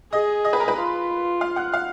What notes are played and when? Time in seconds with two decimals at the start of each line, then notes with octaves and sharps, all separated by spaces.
0.12 G#4 D#5 D#6
0.45 D#5 D#6
0.53 B4 B5
0.60 A#4 A#5
0.68 B4 B5
0.77 F4
1.41 F5 F6
1.56 F#5 F#6
1.73 F5 F6